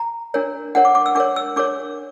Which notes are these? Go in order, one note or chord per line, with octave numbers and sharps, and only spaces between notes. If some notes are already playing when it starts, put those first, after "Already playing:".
Already playing: A#5
D4 A#4 C#5
D4 A#4 C#5 F#5
D6
D6
E6
D4 A#4 C#5 D6
E6
D4 A#4 C#5 D6